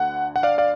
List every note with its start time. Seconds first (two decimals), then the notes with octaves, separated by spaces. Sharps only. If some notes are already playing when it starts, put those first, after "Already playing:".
Already playing: D2 D3 F#5
0.36 F#5
0.43 D5 F5
0.58 D5 F5